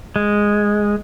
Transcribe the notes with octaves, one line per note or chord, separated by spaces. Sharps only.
G#3